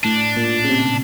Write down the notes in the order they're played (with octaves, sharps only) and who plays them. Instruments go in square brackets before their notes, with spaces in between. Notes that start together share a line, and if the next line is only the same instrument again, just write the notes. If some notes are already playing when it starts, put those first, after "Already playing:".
[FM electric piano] A2 [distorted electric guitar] D4
[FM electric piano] A#2
C#3
C3